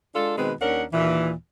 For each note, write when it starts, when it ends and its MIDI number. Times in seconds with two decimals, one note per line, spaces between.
0.15 0.37 56
0.15 0.37 62
0.15 0.37 65
0.15 0.37 69
0.38 0.53 47
0.38 0.53 51
0.38 0.53 56
0.38 0.53 60
0.38 0.53 71
0.61 0.84 39
0.61 0.84 61
0.61 0.84 62
0.61 0.84 70
0.61 0.84 78
0.93 1.33 39
0.93 1.33 46
0.93 1.33 52